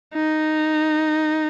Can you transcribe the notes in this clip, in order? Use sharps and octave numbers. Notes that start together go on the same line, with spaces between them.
D#4